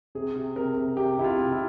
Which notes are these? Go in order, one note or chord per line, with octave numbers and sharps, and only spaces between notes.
C3 G#4
C3
C3 A#4
C3
C3 G4
C3 E4
F4
C3
E4